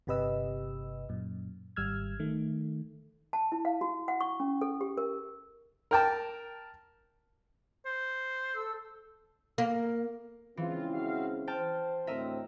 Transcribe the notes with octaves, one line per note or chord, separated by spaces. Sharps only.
G1 C3 G4 B4 D#5 E6
F#2 A#2
G#1 G3 E6 F6 G#6
D#3 A3
A5
E4
F5
F#4
F#5
C#6
C#4
A4
G4
A#4
A#4 G5 A5
C5
A4 E6
A#3 A#4
C#3 E3 G#3 C4 F4
F#4 E5 F5
C5 G5 A5 F6
D2 A2 C4 A#4 D#5 E5